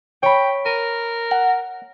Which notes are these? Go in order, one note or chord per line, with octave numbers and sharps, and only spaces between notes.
C#5 G5 B5
A#4 D#7
F#5